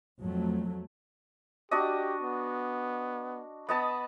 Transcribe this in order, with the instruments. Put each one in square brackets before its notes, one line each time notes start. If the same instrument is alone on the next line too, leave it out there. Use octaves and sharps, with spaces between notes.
[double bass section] F2 F#3 A3
[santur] D4 F#4 D#5 [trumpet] G4
[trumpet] B3
[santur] B3 D#5 A5 [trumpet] B5